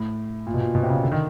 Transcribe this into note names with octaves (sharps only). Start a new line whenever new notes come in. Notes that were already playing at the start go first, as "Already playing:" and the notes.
Already playing: A2
A#2
B2
A#2
B2
C3
C#3
D3
D#3